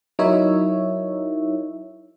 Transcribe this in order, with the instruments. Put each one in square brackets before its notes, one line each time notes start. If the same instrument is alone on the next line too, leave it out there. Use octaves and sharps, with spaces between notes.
[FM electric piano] F#3 D#4 E4 A#4 C#5 E5